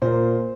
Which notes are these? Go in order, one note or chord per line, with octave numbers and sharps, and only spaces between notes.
A#2 A#3 C5